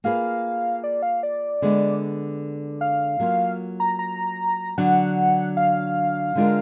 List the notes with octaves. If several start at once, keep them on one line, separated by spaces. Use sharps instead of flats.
A#3 F4 G#4 B4 F5
D5
F5
D5
D3 G#3 B3
F5
F#3 A#3 F4
A#5
A#5
D3 F#3 D4 F#5
F5
D3 G#3 D4 F4 A#4